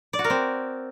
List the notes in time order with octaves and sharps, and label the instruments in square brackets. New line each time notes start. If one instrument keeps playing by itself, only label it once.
[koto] D5
F#4
A#4
C4